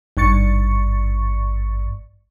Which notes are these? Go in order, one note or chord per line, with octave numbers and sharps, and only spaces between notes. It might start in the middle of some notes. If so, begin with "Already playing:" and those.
G#1 G2 C#6 A6 C#7